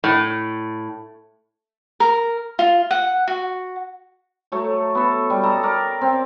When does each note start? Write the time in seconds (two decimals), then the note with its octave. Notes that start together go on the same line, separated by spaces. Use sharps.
0.04 A2
2.00 A#4
2.59 F4
2.91 F#5
3.28 F#4
4.52 F#3 A3 C#5
4.95 B3 A4
5.30 G3
5.43 A4 D#5 A#5
5.63 A#4 D5
6.01 C4